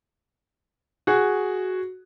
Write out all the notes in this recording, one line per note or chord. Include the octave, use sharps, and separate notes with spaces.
F#4 G#4